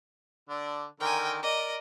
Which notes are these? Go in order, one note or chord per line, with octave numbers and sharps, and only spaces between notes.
D3 D4
D3 D#3 A#4 G5 G#5
A#4 D5 D#5